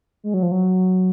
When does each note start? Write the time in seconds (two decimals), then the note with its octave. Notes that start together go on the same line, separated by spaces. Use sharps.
0.24 G#3
0.34 F#3
0.43 F3
0.51 F#3